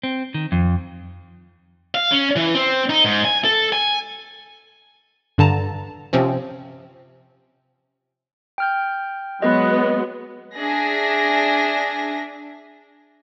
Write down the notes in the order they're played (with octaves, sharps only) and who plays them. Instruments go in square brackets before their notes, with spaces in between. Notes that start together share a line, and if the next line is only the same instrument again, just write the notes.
[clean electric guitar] C4
D#3
F2
[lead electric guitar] F5
C#4
E3
C4
D#4
G#2
G#5
A4
G#5
[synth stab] G2 D3 A5 A#5
C3 F3 C4 C#4
[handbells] G5 F6 G6
[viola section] F#3 G#3 B3 [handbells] D#5
[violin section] D4 G#4 E5 A#6